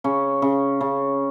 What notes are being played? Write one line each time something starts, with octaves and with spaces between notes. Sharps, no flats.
C#3 C#4
C#3
C#3